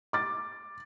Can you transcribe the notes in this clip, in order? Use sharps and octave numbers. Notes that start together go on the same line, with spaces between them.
D6 A6